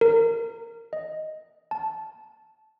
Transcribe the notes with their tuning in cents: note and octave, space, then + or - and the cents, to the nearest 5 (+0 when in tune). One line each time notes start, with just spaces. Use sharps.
A#4 -20
D#5 +0
A5 -15